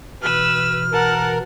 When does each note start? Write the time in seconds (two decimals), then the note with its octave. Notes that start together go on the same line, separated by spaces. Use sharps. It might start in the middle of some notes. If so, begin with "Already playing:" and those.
0.22 B2 E3 B4 E6 F6
0.93 A#4 F#5 A5